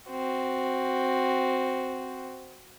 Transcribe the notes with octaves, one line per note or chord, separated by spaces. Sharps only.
C4 F#4